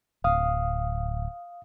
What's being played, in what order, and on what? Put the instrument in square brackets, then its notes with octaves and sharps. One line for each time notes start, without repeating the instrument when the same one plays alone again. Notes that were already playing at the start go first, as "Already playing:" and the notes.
[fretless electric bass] D1 [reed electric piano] F5 D#6